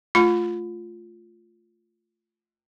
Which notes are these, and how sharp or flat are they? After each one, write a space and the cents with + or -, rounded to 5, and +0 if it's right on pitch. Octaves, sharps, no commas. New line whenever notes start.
A3 -10 F4 +0 B5 +25